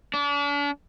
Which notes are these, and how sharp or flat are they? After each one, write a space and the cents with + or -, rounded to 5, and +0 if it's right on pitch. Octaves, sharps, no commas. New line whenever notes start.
D4 -40